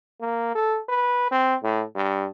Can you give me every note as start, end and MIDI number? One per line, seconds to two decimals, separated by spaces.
0.21 0.54 58
0.55 0.78 69
0.89 1.31 71
1.31 1.55 60
1.63 1.83 45
1.95 2.27 43